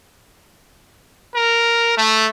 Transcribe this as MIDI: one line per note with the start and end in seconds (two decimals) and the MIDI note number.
1.35 1.92 70
1.98 2.26 57